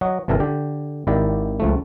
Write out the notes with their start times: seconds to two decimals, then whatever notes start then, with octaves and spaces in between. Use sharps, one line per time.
0.01 F#3 F#4 D#5
0.28 G1 C3 E3 A4 A#4 A#5
0.40 D3 G4 G5
1.07 G#1 D#3 E4 G4 D5
1.60 C#2 F3 A3